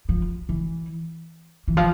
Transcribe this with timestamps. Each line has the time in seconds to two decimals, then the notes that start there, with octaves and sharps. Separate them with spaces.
0.09 F3
0.49 E3
1.68 E3
1.77 F3